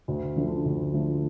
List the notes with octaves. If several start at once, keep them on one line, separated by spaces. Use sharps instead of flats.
D2
D3 F3 A3
D2
D3 F3 A3